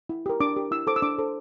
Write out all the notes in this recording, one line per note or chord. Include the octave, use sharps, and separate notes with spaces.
E4
G4 A#4
D4 D6
G4 A#4
E4 E6
A4 C5 D6
E6
D4 D6
A4 C5